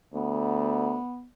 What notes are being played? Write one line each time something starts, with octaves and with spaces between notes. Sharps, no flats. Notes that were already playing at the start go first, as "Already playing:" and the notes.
D2 B3